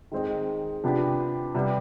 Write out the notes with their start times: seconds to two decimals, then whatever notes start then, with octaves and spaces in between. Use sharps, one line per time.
0.12 D#3 G#3 C4 D#4
0.84 C3 F3 B3 D4 G4
1.55 C3 G3 B3